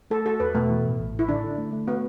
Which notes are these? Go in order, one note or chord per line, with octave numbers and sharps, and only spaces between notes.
A3 A4
F#4 A4
E2 B4
B2 A3
E3
A2
A1
A2
E4
D3 D4
D3
A3
A3
B3 F#4